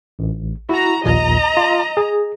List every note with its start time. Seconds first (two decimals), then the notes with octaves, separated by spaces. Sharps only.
0.19 A1
0.69 E4 F#4 A#5
1.04 A#1 D#2 A#2 D#5 A#5
1.57 F4
1.97 G#4